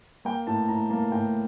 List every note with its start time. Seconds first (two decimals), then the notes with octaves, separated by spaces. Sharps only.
0.25 A#3 G5
0.47 A2 A5
0.68 A2 A#5
0.90 A#3 A5
1.12 A2 G5